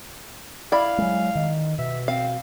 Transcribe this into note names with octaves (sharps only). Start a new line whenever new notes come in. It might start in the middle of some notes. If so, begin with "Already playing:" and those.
E4 D5 F5 B5
F#3 G#3
D#3
B2 E5
C4 F5